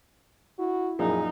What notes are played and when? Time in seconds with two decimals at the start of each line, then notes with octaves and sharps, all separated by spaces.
0.59 E4 F#4
0.99 F#2 A#2 F3 D#4 G#4